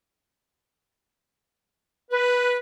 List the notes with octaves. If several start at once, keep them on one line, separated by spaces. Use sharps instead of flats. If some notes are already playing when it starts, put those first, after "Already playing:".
B4